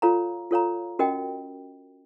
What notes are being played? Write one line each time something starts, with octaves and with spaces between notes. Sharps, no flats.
F4 A4 C#5 F5 A#5
F4 A4 C#5 F5 A#5
C#4 F#4 A#4 D#5 G5